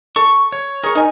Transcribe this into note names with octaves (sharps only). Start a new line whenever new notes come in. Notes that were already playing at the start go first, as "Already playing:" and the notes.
A4 C#6
C#5
G#4 A#4 C#6
D#4 G#5